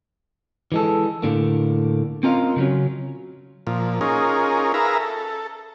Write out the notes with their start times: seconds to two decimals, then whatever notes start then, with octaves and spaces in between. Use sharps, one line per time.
0.72 E3 G#3 A4
1.22 A2 D3 A#3
2.23 C4 C#4 F4 A#4 D#5 F5
2.56 C#3 F#3 C#4
3.67 A#2 F3
4.01 C#4 D#4 F4 G#4 A#4
4.74 G#4 A#4 B4 E5 F5 A#5
5.00 A4